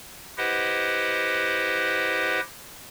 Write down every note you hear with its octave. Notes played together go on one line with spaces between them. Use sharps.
E4 G4 B4 C5 D#5 F#5